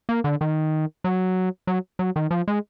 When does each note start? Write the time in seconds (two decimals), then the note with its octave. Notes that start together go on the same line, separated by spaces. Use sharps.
0.09 A#3
0.24 D3
0.41 D#3
1.04 F#3
1.67 F#3
1.99 F#3
2.16 D#3
2.31 F3
2.48 G#3